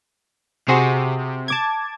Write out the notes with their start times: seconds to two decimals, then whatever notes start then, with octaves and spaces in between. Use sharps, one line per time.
0.69 C3 F#4 G#4 C5 D#6
1.48 A5 D6 G#6